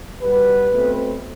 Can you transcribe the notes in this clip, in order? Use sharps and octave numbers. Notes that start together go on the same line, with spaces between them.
B2 G3 B3 B4
B2 A3 C4